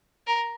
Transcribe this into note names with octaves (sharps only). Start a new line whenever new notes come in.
A#4